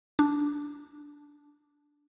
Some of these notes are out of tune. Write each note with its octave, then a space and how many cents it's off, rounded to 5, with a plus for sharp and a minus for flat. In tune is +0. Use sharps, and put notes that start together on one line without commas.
D4 -5